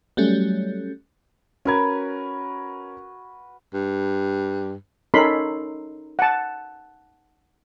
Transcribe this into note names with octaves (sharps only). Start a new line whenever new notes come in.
F#3 G3 A3 C#4
C#4 F#4 A#4 B4 G#6
G2
C#4 D#4 A4 A#4 B5 C6
F#5 A5